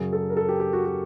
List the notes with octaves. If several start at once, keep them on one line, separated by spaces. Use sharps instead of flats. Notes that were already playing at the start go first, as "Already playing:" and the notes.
Already playing: F#2 C#3 F#3 G#4
A4
A#4
A4
G4
G4
F#4
F#4